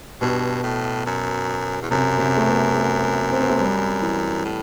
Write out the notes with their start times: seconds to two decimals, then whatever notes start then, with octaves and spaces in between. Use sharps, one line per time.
0.21 G2 B2
0.64 A2
1.06 F#2
1.82 E2
1.91 F#2 C3
2.18 C3
2.37 A3
2.47 B3
2.75 A3
3.31 C4
3.41 B3
3.50 A3
3.60 G3
4.02 E3
4.45 A2